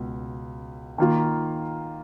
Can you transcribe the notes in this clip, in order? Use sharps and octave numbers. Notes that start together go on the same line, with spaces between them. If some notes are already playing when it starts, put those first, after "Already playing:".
Already playing: C#2 B2
D#3 A#3 F4